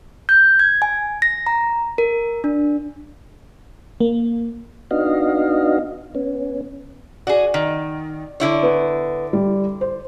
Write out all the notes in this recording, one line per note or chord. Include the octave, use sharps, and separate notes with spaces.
G6
G#6
G#5
A#6
A#5
A#4
D4
A#3
B3 D4 D#4 F#4 D#5 F5
B3 C#4
F#4 G#4 D5
D#3
D3 E4 C#5
B3
G3
C5